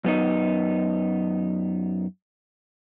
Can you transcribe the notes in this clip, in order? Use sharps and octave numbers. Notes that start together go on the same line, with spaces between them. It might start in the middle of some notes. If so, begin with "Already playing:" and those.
F#2 B3 D#4